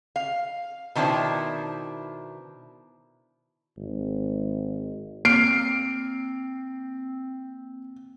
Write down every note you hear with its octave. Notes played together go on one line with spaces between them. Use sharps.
F5
B2 D#3 D4 E4 C5
G#1
A#3 C4 F6 C7 D7